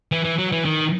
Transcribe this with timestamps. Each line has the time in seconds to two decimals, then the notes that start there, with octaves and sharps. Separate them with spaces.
0.12 E3
0.24 E3
0.38 F#3
0.52 E3
0.65 D#3